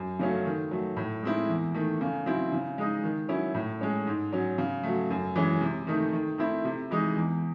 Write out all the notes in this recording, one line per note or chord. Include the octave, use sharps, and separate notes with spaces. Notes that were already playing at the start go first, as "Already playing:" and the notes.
Already playing: F#2
C#3 F#3 A3 C#4
D#3
F#3 A3
A2
G#3 C4 E4
E2
D#3 A3
C#3
F#3 C4 E4
C#3
G#3 D#4
D#3
F#3 C#4 E4
A2
G#3 C#4
G#2
F#3 C#4
C#3
F#3 A3
F#2
E3 G#3 C#4
C3
D#3 A3 D#4
D#3
A3 C4 E4
C3
E3 G#3 D#4
E2